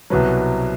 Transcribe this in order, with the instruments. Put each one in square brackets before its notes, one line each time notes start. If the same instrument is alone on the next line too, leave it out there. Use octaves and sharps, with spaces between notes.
[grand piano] C2 B2 F#3 B4